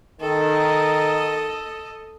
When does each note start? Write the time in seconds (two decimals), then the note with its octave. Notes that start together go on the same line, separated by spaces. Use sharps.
0.21 D#3 A4 D#5